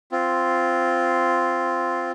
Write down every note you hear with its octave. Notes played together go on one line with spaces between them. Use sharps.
C4 F4